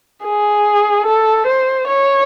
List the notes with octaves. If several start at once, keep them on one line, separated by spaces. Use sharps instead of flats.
G#4
A4
C5
C#5